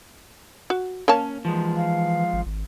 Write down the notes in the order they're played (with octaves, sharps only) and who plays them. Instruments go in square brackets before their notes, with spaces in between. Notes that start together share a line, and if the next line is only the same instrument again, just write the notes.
[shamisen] F#4
[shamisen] A#3 C#5 A5 [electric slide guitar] C#4
[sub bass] E3 [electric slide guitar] F3 G#3
[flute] F5
[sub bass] G#1
G#1